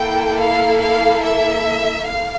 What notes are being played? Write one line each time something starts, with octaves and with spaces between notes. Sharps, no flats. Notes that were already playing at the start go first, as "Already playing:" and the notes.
Already playing: A#3 E4 A4 G5
F5
F5
E5
F5